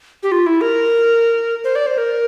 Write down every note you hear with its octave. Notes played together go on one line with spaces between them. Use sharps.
G4
F4
E4
A#4
C5
D5
C5
A#4